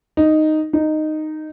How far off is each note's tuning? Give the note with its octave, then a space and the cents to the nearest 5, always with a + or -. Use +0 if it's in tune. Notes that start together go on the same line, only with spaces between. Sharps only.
D#4 -5
D#4 -10